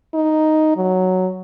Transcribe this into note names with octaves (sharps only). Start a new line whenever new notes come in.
D#4
F#3